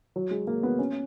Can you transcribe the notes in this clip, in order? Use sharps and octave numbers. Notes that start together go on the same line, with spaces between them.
F#3
G#3
A#3
B3
C#4